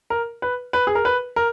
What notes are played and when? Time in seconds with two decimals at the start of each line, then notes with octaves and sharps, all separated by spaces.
0.10 A#4
0.42 B4
0.73 B4
0.87 G#4
0.95 A#4
1.05 B4
1.36 A#4